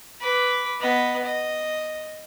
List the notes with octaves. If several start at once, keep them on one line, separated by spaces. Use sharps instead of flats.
B4 D6
B3 D#5
D#5